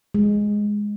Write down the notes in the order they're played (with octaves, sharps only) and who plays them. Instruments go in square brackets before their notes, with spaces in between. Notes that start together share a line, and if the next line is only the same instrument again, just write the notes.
[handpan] G#3